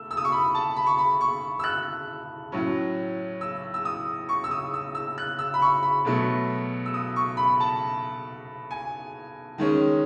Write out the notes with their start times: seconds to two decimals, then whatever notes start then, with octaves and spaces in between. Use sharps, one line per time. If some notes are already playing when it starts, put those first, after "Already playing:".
Already playing: A3 E6
0.11 E6
0.17 D#6
0.24 C#6
0.32 B5
0.55 A5
0.76 B5
0.86 C#6
0.98 B5
1.21 C#6
1.59 E6
1.64 F#6
2.52 A2 F#3 C#4
3.41 E6
3.74 E6
3.85 D#6
4.29 C#6
4.44 E6
4.51 D#6
4.74 E6
4.95 E6
5.18 F#6
5.39 E6
5.54 B5
5.62 C#6
5.83 B5
6.05 B2 F#3 A3
6.86 E6
6.94 D#6
7.16 C#6
7.37 B5
7.60 A5
8.71 G#5
9.58 D#3 G#3 C#4